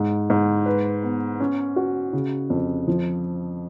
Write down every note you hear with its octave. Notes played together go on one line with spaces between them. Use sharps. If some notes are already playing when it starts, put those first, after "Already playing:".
Already playing: G#2
G#2
B4
B3
C#4
F#4
C#3
F2
F3